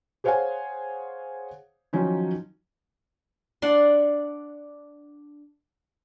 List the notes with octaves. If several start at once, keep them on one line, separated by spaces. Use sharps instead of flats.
G#4 C5 C#5 F5 F#5 G#5
D#3 F3 F#3 C#4 D#4
D4 D5 F#5 C6